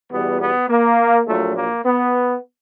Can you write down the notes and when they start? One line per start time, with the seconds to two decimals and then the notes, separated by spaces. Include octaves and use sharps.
0.10 E2 B2 G3 B3
0.40 B3
0.69 A#3
1.26 A#1 A#2 F#3 A3
1.55 A#3
1.85 B3